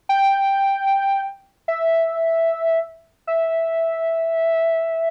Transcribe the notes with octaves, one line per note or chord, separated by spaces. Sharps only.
G5
E5
E5